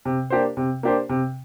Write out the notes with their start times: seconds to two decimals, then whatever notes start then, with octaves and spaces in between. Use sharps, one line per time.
0.05 C3
0.30 A#3 D4 G4 C5
0.57 C3
0.83 A#3 D4 G4 C5
1.09 C3